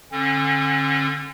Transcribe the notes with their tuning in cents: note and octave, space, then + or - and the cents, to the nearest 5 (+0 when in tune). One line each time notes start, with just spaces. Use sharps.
D3 +0 C#4 -35